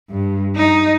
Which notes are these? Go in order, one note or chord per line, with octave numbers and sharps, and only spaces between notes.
G2
D#4